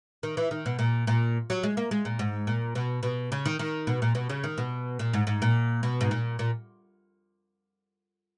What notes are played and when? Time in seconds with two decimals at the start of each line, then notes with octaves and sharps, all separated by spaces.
0.23 D#3
0.37 E3
0.51 D#3
0.66 B2
0.79 A#2
1.07 A#2
1.50 F#3
1.63 G#3
1.77 A#3
1.91 G#3
2.05 A#2
2.19 G#2
2.47 A#2
2.75 B2
3.03 B2
3.32 C#3
3.46 D#3
3.59 D#3
3.87 B2
4.02 A#2
4.15 B2
4.29 C#3
4.44 D#3
4.58 B2
4.99 A#2
5.13 G#2
5.27 G#2
5.42 A#2
5.83 B2
6.01 G#2
6.11 A#2
6.39 A#2